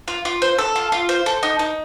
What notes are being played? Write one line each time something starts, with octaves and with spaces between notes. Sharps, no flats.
F4
F4
C5
A4
F4
F4
C5
A4
D#4
D#4